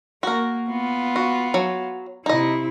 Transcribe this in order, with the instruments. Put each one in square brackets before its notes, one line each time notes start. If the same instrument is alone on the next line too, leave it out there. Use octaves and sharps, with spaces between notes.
[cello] A#3 [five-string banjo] F#4 A#4
[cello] B3 F4
[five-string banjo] F#4
F#3
[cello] C3 E4 [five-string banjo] D#4 D#5